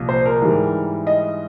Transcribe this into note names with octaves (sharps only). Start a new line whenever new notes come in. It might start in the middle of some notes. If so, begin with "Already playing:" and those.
Already playing: C2 A#2 F3
C5
A#4
G#2 E3 G3
D#5